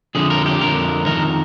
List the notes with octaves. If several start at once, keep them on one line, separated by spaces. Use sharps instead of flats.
F2 D3 G#4
A#4
G4
F2 D3 A#4
F2 C3 D#3 A#4